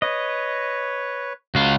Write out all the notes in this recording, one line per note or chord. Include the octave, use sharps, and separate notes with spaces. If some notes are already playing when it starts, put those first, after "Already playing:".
B4 C#5 D#5
C#2 F4 F#4